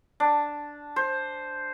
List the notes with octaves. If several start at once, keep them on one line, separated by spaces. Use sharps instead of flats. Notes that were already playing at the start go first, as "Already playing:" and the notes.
D4
C5